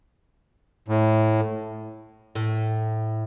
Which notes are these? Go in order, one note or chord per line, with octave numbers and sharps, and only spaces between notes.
A2
A2